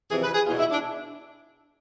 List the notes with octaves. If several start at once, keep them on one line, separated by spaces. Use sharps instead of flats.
F2 C3 E3 G#4
B4
G#4
E2 B2 F4
E4
D4